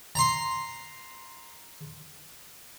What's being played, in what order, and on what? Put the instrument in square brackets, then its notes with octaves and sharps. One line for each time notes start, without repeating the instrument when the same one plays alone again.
[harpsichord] A#5 C6